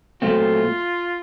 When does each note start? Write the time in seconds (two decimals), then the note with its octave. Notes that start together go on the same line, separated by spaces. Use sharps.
0.22 A#2 F#3 A3 C4 F4